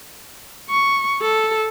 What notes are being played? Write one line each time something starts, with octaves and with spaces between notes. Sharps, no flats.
C#6
A4